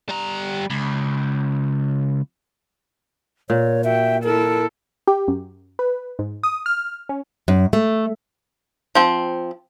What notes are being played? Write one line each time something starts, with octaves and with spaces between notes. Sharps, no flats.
G3 A#5
C#2
A#2 C#5
F#4 E5 G5
E4 A4 A#4
G4
F#2
B4
G#2
D#6
F6
C#4
F#2
A3
F3 C4